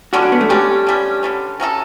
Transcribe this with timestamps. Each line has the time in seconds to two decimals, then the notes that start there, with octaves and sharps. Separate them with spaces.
0.13 D3 G3 C#4 F#4
0.23 D4
0.32 B3
0.41 A3
0.49 D3 G3 C#4 G4
0.87 D3 G3 C#4
1.23 D3 G3 C#4
1.60 F#3 C#4 F#4 A4